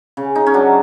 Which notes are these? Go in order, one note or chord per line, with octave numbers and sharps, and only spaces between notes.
C#3
D#4
C#4
F#3 D4